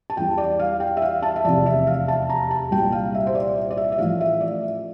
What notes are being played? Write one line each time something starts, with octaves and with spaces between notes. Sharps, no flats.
A5
E2 E3 G3 G5
D5
F5
G5
E5
F5
A5
E5
F1 E2 C3 D5
E5
F5
A5
A#5
A5
C2 A#2 G3 G5
F5
E5
C5
D5
D5
E5
E5
A1 A2 F3 A3 F5
E5
D5